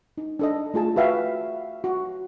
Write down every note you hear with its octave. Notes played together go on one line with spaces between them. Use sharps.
D#4
D4 A4 D#5
A3 F4 G#4 A5
F#4 B4 E5 F5 G5
F#4